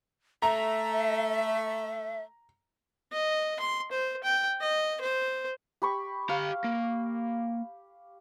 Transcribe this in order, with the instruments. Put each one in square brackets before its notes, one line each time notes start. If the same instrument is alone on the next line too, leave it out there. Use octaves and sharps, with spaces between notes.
[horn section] A3 [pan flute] E5 [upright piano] A#5
[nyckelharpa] D#5
C6
C5
G5
D#5
C5
[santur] G4 B5 C#6
[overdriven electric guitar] G4 A#5 [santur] F5
[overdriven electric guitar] A#3